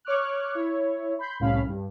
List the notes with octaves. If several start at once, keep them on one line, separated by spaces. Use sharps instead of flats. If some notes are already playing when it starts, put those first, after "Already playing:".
C#5 C#6 D6 F6 F#6
E4 C#5
B5 C6 G6
C2 A2 C#4 F5 B5
G2